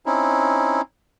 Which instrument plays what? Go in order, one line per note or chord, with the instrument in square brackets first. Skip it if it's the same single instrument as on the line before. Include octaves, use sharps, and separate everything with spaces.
[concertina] C4 C#4 D#4 E4